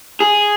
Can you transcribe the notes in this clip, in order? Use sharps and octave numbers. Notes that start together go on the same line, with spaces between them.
G#4